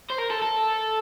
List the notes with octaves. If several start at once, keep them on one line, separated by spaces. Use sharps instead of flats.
C5
A#4
A4
A4